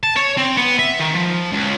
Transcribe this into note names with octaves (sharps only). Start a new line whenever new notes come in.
A5
C#5
C4
B3
E5
D#3
F3
C#2